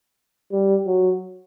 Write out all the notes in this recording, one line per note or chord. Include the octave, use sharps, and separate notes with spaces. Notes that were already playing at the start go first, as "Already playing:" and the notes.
G3
F#3